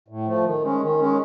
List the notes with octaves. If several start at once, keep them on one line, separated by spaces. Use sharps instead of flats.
A2
F3 A3
D#3
G#3 C#4
D#3
G#3 C#4